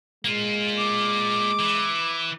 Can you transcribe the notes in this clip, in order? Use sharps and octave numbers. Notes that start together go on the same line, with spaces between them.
G#3 A#3 F4
D6
E3